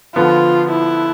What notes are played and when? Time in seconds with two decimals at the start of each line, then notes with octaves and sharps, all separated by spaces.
0.15 D3 F3 B3 F4
0.71 E4